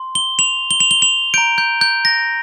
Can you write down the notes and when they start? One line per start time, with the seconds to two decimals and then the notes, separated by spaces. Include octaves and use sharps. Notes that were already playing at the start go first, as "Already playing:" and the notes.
Already playing: C6
0.15 G7
0.39 F7
0.71 G7
0.80 F7
0.91 G7
1.02 F7
1.34 A#5 G6 D7
1.58 G6
1.81 G6
2.05 A#6